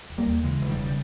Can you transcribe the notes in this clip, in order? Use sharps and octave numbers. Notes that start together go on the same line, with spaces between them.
E1
G3 A#3
D#2
C#3 E3 G#3
E1
D#3 G3
C#3
G3